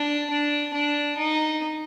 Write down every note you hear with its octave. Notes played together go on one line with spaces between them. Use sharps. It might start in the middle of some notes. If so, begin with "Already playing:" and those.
Already playing: D4
D4
D4
D#4